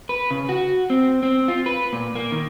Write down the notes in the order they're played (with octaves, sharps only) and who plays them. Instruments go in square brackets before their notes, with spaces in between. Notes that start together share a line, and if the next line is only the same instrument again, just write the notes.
[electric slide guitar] B4
C#3
F#4
C4
C4
F4
B4
A#2
A#3
D#3